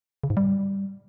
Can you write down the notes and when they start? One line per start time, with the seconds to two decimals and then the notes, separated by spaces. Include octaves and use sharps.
0.24 C#3
0.30 G#2
0.37 G3